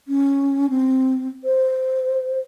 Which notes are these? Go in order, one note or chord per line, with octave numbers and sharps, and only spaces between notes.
C#4
C4
C5